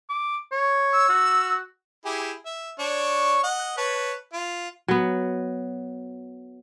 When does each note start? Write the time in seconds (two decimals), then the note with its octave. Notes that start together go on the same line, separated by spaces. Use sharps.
0.09 D6
0.52 C#5
0.93 E6
1.09 F#4
2.06 E4 G4 G#4
2.46 E5
2.79 D4 C#5 C#6
3.43 D#5 F#5
3.77 B4 C#5 A5
4.33 F4
4.88 F#3 B3